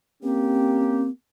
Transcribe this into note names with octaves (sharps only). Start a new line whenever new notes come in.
A#3 C4 C#4 G4